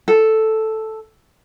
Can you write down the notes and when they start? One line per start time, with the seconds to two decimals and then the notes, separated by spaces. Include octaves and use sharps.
0.08 A4